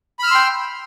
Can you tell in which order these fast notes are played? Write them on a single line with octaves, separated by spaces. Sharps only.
B5 F6 E6 C6 G5